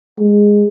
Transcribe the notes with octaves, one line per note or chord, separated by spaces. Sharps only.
G#3